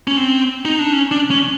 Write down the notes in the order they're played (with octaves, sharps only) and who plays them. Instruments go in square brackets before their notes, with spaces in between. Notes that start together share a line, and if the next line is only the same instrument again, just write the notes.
[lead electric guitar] C#4
C4
D#4
D4
C#4
D4
C#4